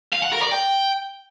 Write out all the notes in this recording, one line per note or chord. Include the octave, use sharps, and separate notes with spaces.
F5
F#5
A#4
D5
G5